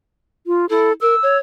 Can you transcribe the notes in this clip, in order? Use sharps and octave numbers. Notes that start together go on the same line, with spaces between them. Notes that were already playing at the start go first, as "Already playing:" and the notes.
F4
E4 A4
A#4 E6
C#5